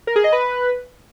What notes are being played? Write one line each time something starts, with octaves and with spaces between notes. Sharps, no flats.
A#4
G#4
D#5
B4